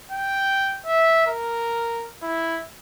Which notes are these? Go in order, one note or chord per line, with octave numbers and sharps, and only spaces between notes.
G5
E5
A#4
E4